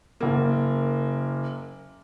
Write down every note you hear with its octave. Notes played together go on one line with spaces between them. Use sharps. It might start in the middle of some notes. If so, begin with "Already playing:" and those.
F#1 A#3